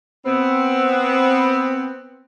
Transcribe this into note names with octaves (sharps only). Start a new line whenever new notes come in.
B3 C4